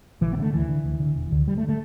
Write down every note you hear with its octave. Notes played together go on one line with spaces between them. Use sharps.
A1 E3
B3
G2 D3 A3
D2 E3
D3
D2
D3
E1
D2 D3
D2 G3
A3
D3
A3